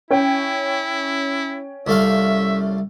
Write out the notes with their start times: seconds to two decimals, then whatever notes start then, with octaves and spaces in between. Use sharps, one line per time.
0.11 C#4 E4 G5
1.87 C2 A3 E5 F5